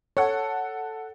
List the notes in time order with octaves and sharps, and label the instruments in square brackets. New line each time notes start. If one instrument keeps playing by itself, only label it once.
[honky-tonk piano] A4 F#5 [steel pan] C#5